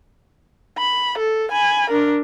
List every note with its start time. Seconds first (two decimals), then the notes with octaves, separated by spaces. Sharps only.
0.78 B5
1.18 A4
1.51 G#5 B5
1.90 D4 A#4